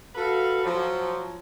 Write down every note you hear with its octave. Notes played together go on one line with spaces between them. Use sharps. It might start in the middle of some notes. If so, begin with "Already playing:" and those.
F#4 A4 B4 F5
F3 F#3